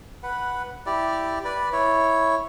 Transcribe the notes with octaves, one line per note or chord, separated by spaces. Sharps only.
B4 F#5
E4 G4 D5
B4 D5
E4 C#5